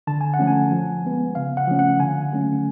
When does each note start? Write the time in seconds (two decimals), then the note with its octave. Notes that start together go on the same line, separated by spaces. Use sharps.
0.07 D3 A5
0.21 G#5
0.34 F#5
0.39 F3 A3 C#4
0.47 G#5
0.71 F3
1.04 G#3 B3
1.35 C#3 F5
1.57 F#5
1.67 F3 A3 C#4
1.79 F#5
2.00 D3 G#5
2.32 F#3 A3 C#4